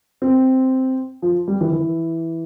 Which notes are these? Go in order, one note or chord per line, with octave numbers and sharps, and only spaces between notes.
C4
F3
G3
E3
E3